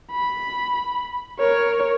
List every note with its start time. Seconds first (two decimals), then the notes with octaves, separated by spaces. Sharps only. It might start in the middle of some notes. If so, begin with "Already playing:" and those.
0.12 B5
1.39 A#4 C#5